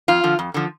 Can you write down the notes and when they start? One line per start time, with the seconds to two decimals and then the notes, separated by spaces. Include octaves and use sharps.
0.08 F2 F4
0.24 D3 F3
0.39 F2
0.54 D3 F3